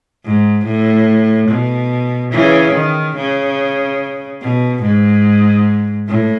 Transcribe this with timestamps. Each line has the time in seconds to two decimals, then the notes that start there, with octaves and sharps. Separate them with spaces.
0.25 G#2
0.65 A2
1.49 B2
2.32 C#3 E3
2.75 D#3
3.16 C#3
4.41 B2
4.82 G#2
6.08 A2